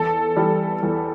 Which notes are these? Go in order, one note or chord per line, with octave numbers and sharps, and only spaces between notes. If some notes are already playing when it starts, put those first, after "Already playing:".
Already playing: E2 A4
E3 G3
E2